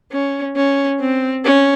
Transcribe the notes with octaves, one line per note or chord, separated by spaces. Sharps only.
C#4
C#4
C4
C#4